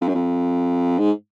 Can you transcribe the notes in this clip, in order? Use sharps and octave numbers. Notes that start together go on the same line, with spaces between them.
F2
F#2
F2
G#2